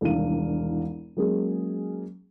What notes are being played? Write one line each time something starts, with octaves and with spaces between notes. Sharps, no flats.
E1 C2 D#3 D4 F5 D#7
F#3 G#3 A#3 C#4 G#4